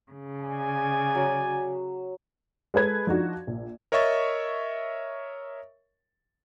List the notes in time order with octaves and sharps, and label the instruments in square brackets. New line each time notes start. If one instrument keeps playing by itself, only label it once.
[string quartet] C#3
[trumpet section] D5 G#5
[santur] F#3
[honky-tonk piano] G#3 A4 B4 G#6
F3 D4 D#4 F#4
A#1
[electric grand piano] A#4 C#5 D#5 E5 C#6 A6